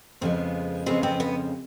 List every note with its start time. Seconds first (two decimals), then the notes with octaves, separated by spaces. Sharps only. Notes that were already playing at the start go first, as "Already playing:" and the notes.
0.21 F2 C#3 F3 G#3 B3 C4
0.86 F2 C#3 F3 G#3 B3 C4
1.03 C4
1.20 B3